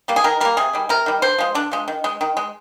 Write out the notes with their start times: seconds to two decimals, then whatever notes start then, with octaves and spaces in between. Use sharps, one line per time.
0.08 G3 A#3
0.16 G#4
0.24 D#3 A#4
0.40 G3 A#3 A#4
0.57 C3 G#4
0.73 D#3 G3
0.89 C3 A#4
1.06 D#3 G3
1.22 D3 C5
1.38 F3 G#3
1.55 D3 D4
1.71 F3 G#3
1.88 D#3
2.04 G#3
2.21 D#3
2.37 G#3